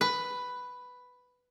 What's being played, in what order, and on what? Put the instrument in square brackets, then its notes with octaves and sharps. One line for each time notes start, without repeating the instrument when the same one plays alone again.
[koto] B4